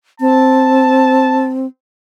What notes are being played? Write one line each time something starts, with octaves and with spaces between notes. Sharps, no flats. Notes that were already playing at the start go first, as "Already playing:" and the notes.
C4 A5